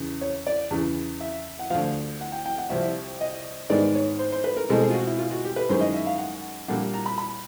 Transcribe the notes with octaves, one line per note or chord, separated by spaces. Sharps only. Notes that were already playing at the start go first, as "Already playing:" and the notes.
Already playing: E2 C#3 E3
C#5
D5
E2 C#3 E3
E5
F#5
D2 D3 F3 F5
F#5
G5
G5
F#5
C2 C3 F3 E5
D#5
G#2 D#3 G#3 B3 D5
C#5
C5
C5
B4
A#4
B2 G#3 C4 A4
G#4
F4
F#4
E4
F4
F#4
G4
B4
F#2 D#3 G#3 C5
D#5
E5
F5
F#5
A#2 G3 A#3 D4 F#5
A#5
B5
B5